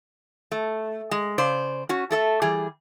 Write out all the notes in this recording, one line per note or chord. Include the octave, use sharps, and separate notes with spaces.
A3
G#3
C#3 C5 D5
C#4 F#4
A3 A4 E5
E3 G3 G#4